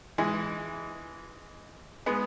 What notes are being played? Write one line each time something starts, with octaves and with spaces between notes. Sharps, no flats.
E3 G#3
G#3 B3